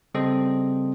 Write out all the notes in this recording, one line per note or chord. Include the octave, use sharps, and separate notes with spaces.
C#3 G3 C4 A4 C5 D#5